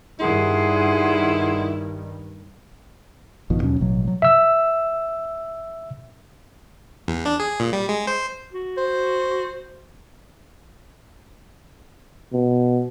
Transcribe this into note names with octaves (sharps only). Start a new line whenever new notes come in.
G2 D#3 G3 E4 G#4 F#5 C6
G#1 F2 B2 D#3
D#2 B2 F#3 C#4
A1 B2 F#3
F#3 G3
E5 E6
E2
D4
G#4
A#2
G3
G#3
C5
F#4
C5
B2